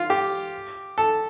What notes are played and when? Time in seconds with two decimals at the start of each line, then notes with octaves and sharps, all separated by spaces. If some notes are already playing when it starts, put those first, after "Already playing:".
Already playing: F4
0.10 G4
0.98 A4